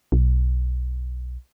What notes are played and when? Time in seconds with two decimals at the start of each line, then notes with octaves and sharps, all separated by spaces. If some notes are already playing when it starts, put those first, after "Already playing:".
0.12 B1